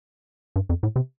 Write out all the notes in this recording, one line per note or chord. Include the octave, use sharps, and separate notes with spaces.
G2
F2
A2
C3